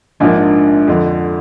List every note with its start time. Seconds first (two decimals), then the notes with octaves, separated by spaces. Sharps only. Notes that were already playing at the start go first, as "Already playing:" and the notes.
0.20 A#1 G#2 F3 A#3 D4
0.88 F2 D3 F3